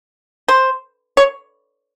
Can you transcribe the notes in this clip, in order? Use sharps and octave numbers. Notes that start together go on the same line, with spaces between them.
C5
C#5